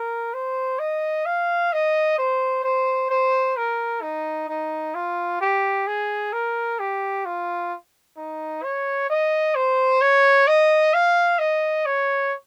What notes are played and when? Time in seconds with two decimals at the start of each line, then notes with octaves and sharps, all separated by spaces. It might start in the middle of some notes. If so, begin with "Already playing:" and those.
Already playing: A#4
0.34 C5
0.79 D#5
1.26 F5
1.72 D#5
2.18 C5
2.64 C5
3.10 C5
3.57 A#4
4.02 D#4
4.49 D#4
4.95 F4
5.41 G4
5.87 G#4
6.33 A#4
6.79 G4
7.25 F4
8.17 D#4
8.63 C#5
9.10 D#5
9.55 C5
10.01 C#5
10.47 D#5
10.94 F5
11.39 D#5
11.86 C#5